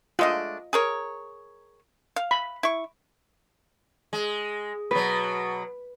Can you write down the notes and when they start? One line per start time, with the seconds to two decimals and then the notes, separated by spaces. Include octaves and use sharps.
0.19 G#3 A3 D4 F4 D#5
0.73 G#4 A#4 C#5
2.16 F5
2.31 B5
2.63 E4 C#6
4.13 G#3
4.91 B2 F#3 B4